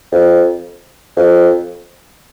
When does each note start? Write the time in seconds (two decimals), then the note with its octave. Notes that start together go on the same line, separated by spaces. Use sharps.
0.12 F2
1.17 F2